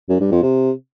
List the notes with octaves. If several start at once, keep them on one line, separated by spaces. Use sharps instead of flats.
F#2
G2
F2
C3